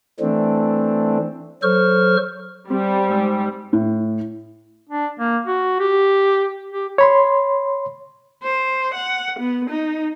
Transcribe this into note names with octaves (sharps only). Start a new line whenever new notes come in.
E3 A3 C4 D4
F#3 A4 C5 C#6 F6
G3 C4
G#2 G#3 E6
A2
D4
A#3
F#4
G4
G4
C#5 B5 C6
C5
F#5
B3
D#4